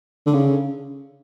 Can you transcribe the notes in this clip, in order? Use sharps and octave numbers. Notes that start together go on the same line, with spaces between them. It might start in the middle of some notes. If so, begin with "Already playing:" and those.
D3
C#3